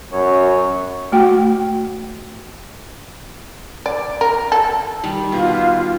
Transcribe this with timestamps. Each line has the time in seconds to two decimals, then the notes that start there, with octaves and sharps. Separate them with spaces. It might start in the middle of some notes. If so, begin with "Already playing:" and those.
0.12 F#2 C#5
1.12 A3 F#4 G5
3.86 D5
4.21 A#4
4.52 A4
5.04 D#3 G3
5.32 B2 F4